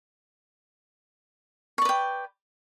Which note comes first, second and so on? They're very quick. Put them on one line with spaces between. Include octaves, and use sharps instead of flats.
C#6 D5 B4 G5